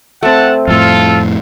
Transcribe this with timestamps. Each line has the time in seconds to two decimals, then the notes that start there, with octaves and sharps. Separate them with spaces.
0.23 A3 C4 F#5 A5
0.68 F2 A2 F4 A4